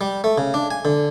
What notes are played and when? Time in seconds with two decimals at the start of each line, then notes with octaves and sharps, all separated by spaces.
0.01 G3
0.24 A3
0.38 C#3
0.54 D4
0.71 G#5
0.85 D3